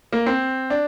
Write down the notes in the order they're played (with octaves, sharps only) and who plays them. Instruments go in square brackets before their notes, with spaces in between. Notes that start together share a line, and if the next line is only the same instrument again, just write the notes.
[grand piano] A#3
C4
D4